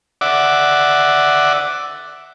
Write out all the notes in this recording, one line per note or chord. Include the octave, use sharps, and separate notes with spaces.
D5 E5 F#5 D6